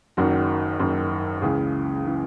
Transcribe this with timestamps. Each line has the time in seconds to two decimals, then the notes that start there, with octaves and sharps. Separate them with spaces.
0.17 F#1 F#2 D#3 F#4
0.79 F#1 F#2 D#3
1.42 C#2 C#3 E3 G#4
2.05 C#3 E3